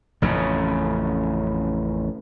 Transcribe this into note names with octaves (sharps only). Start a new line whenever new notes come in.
A1 F2 C#3